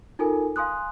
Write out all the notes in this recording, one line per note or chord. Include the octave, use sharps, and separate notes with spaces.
D#4 F4 A4 A#4 G#5
F5 G#5 C6 D#6 F#6